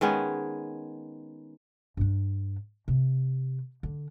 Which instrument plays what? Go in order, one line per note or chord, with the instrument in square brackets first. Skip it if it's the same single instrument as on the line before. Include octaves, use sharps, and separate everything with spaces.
[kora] D#3 G#3 B3 C#4
[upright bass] G2 D4
C3
D3